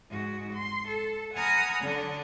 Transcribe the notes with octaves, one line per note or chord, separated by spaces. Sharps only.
G#2 F#4
C6
A4
F#5 G#5 A#5 B5 D#6 F6
D3 F#3 D4